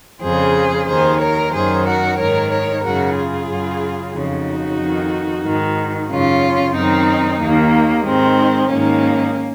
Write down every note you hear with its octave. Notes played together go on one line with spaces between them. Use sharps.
F2 C#3 G#4 C5
D#2 D#3 G#4 C5
A#4 C#5
F#2 D#3 G#4 C5
F#4 A#4
G#2 D#3 A#4 C#5
A#4 C#5
F#2 C#3 F#4 A#4
F4 G#4
F#2 C#3
F2 C#3 D#4 F#4
F2 D#3
G#2 D#3
F#2 C#3 C#4 F4
F#2 D#3 C4 D#4
D#2 D#3 A#3
G#2 D#3 G#3 C4
G#2 D#3 A#3 C#4